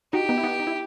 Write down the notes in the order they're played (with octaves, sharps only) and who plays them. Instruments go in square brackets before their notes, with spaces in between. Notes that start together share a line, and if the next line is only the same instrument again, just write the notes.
[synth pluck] D#4 F#4 [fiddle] G4
[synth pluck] B3 D#4
E4
B3 D#4
D#4
E4